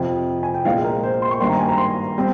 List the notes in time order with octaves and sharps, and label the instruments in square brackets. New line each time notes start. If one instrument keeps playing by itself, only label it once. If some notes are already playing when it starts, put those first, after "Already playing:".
Already playing: [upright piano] F2 C3 F3
G#5
G5
A#1 A#2 G#3 F5
A#4
C5
C6
C#6
G#1 G2 G3 A#3 C6
A#5
G#5
A#5
C6
G3 C4